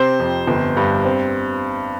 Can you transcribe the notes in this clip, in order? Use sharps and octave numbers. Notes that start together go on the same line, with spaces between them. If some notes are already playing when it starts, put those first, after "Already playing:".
Already playing: C3 C5
F2
G1
G2
C4